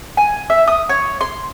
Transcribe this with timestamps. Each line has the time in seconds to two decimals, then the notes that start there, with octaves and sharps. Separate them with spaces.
0.17 G#5
0.50 E5
0.68 D#6
0.89 C#5
1.21 C6